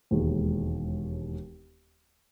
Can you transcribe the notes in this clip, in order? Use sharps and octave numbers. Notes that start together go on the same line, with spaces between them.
E1 D#2 D#3 G#3